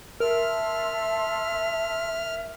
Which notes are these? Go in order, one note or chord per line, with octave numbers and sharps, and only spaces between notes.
A#4 E5 A5 C6 E6 F6